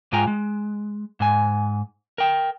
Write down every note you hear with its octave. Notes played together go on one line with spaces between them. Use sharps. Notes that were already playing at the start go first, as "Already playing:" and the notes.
G#2 G#3 F4 G5 G#5 A#5
G#3
G#2 G#5
A#4 G5